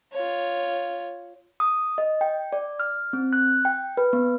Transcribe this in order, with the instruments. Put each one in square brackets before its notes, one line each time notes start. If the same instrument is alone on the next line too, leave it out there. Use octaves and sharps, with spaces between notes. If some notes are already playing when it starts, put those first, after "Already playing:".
[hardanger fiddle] F4 C#5
[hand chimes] D#6
D#5
G5
D5
F6
C4
F#6
G5
B4
B3